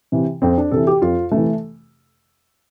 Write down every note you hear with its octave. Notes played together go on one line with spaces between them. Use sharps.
C3 E3
F2 C4
D4
C3 E3 A4
G4
F2 F4
C3 E3 A3